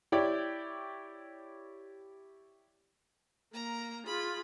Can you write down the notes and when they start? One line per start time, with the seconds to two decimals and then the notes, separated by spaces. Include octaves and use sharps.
0.12 E4 G4 C#5 D5 G5
3.54 A#3 A#5
4.06 F4 G#4 B5